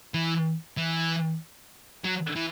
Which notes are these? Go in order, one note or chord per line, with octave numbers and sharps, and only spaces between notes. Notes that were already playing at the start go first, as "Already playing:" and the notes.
E3
E3
F#3
E3